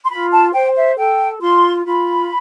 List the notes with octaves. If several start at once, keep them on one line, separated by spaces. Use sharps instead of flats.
C6
F4 B5
A5
C5 G5
E5
A4 G5
F4 C6
F4 B5